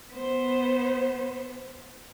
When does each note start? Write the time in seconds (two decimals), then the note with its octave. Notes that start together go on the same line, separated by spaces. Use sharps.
0.13 B3 C5